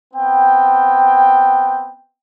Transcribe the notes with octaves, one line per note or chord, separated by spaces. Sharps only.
B3 C4 G5